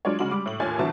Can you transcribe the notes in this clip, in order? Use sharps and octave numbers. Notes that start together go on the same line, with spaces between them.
F#3 G#3 D4 F4 C#5
C#3 G#3 F#4 F#7
G3 D6
A2 F#7
D#2 A2 F4 C#5 G#5 A6
C2 B2 D3 E3 A5 A6